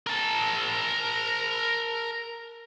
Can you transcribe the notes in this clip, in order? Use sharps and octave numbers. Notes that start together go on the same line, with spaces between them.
A#4 A5